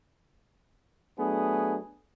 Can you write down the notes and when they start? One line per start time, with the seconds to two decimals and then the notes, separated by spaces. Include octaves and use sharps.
1.17 F#3 A3 B3 D4 G#4